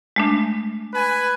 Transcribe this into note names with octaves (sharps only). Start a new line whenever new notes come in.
G#3 A3 D4
B4 G#5